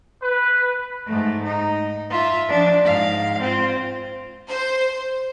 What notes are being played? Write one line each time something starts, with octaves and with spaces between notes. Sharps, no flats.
B4
G#2 A3
D#4
F4 E5
F3 D4
G#2 F5
C4 F4
C5